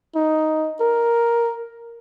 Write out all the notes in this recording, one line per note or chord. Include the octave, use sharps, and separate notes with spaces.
D#4
A#4